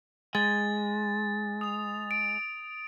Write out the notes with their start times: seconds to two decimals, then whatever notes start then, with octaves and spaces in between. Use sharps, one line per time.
0.35 G#3 A6
1.61 D#6 F7
2.11 D7